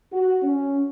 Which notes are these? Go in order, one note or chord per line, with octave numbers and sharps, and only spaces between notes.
F#4
C#4